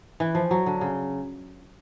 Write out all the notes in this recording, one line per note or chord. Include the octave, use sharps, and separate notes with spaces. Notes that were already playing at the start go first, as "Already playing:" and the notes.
E3
F3
F#3
D3
C#3